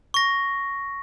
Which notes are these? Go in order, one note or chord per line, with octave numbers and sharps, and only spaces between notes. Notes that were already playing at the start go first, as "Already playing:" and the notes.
C#6 A#6